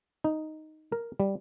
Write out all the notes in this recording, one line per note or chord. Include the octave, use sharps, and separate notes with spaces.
D#4
A#4
G3